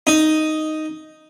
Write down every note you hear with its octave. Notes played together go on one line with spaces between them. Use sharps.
D#4